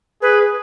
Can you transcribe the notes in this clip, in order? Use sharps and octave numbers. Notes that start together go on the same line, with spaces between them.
G#4 B4